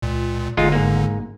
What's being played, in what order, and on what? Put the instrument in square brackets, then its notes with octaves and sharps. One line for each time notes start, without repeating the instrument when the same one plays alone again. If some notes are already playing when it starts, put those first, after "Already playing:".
[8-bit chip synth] C#2 A#2
[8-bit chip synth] G1 D3 [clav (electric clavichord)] G#3 D#4 F4
[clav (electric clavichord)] G#2 A#3